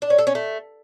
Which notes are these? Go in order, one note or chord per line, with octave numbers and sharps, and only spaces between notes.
D4
C#4
A4
C#4
A3